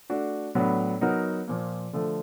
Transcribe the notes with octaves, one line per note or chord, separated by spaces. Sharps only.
A3 D4 F#4
A2 F#3 B3 D4
F#3 B3 D#4 F#4 A#4
A#2 F3 A#3
D3 F3 A3